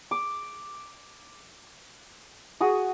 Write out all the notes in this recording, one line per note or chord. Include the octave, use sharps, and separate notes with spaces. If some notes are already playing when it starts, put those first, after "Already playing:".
D6
F#4 G#4 D#6